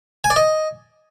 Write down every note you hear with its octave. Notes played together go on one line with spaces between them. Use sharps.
G#5
D5
D#5